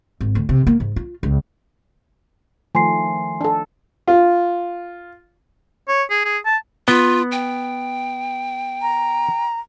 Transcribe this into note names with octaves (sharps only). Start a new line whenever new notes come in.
G#1
D2
C3
A#3
G#2
F4
C#2
D#3 F3 A3 G#5 C6 C7
D4 A4
F4
C#5
G#4
G#4
A5
B3 F4
G5
A#5